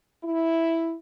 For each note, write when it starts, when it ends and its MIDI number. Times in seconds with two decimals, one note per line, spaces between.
0.24 0.95 64